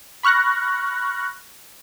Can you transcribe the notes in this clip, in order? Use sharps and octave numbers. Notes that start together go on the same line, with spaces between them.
B5 C#6 F6 F#6 A#6